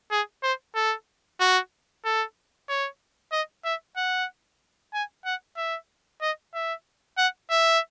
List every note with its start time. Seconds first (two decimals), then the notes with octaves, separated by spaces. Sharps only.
0.11 G#4
0.43 C5
0.75 A4
1.40 F#4
2.05 A4
2.69 C#5
3.32 D#5
3.65 E5
3.97 F#5
4.94 G#5
5.25 F#5
5.57 E5
6.22 D#5
6.54 E5
7.18 F#5
7.50 E5